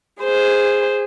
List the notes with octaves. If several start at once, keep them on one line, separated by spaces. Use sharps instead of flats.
G#4 C5